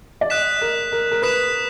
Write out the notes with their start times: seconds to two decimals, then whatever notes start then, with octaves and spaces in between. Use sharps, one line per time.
0.21 D5
0.30 D#5 D#6 F#6 B6 E7
0.62 A#4
0.92 A#4
1.11 A#4
1.22 B4 D#6 F#6 B6 E7